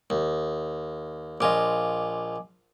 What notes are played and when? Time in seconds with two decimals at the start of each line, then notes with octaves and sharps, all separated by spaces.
0.10 D#2
1.41 A#1 F4 D#5 G#5 D6